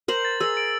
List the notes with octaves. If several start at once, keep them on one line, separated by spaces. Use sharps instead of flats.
A#4 C5 F#7
A6
G#4 A#4 E6
D7